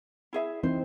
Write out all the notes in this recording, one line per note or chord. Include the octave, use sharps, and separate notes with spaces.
E4 G#4 E5
E3 C4 D#4 C5